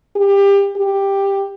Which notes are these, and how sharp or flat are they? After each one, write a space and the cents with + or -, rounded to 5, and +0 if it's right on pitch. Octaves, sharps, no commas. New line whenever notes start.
G4 +25
G4 +10